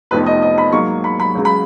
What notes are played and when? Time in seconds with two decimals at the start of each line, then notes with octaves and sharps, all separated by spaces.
0.11 F1 F2 F3 B3 D#4 B4
0.26 D#5
0.42 D#5
0.58 B5
0.72 G#2 F#3 A#3 C#6
1.04 B5
1.20 B5
1.35 C#2 C#3 F#3
1.45 B5